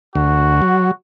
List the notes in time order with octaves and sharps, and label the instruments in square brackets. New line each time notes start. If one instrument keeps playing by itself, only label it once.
[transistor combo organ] D2 [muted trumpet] F#4
[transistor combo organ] F#3